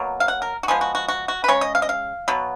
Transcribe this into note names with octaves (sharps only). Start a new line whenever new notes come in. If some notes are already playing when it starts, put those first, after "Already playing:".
Already playing: B2 F#3 A#3
F5
F#5
A#4
F#4
F3 G#3 B3 G#4
F#4
F#4
F#4
F#4
B4
C#3 G#3 C#5
D#5
F5
D#5
F5
B2 F#3 B3